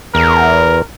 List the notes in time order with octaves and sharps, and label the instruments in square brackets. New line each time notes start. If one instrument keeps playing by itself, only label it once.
[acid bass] E2 [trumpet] A#4